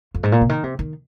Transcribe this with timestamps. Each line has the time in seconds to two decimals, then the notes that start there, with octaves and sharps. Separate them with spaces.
0.15 F2
0.23 G#2
0.32 A#2
0.41 C3
0.49 D#3
0.64 C3
0.79 D#3